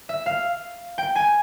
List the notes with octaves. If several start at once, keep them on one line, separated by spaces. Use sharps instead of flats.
E5
F5
G5
G#5